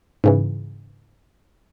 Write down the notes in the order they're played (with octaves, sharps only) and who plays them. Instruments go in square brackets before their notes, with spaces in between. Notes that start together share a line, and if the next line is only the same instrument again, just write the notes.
[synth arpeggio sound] G#2 C#3 E3